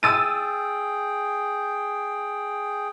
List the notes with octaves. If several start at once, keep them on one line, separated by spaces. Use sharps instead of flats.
G#4 G5 E6 A6 D#7